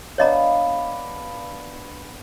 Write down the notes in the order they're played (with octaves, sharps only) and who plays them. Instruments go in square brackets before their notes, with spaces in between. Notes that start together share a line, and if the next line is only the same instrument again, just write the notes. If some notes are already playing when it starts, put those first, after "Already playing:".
[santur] B3 D4 F5 [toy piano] C#5 D#5 A#5